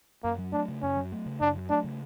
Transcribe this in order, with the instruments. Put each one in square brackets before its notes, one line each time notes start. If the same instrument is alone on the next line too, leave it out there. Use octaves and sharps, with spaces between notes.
[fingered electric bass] F#2 [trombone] A#3
[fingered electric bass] F#3
[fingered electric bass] A3 [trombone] D4
[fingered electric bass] C#3
[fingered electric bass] F#2 [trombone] C#4
[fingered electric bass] F#3
A3
C#3
[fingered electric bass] F#2 [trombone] D4
[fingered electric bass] F#3
[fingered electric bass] A3 [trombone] D4
[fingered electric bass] C#3